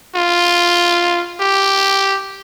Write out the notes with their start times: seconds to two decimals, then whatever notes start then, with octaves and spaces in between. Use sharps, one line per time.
0.15 F4
1.40 G4